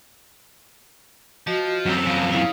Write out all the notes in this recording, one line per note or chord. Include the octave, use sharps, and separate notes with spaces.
F3 F#4 D#5
F#2 C4
F3 F#3 F5
C#3 E4 F5